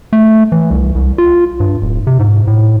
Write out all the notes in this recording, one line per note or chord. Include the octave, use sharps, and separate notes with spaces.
A3
E3
C2
C2
F4
G2
D1
C3
G#2
A2